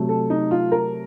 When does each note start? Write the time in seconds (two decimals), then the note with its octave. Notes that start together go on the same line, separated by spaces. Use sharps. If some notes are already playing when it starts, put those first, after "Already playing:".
Already playing: C3 F#3 A3
0.09 A4
0.30 D#4
0.51 F4
0.72 A#4